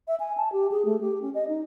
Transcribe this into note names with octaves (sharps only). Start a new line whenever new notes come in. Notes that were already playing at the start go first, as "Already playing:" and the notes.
E5
G#5
A5
G4
G#4
A3
G4
C#4
D#5
D#4